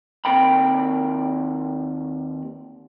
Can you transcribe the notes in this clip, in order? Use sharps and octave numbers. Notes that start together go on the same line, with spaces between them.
D#2 C4 A#4 G5 B5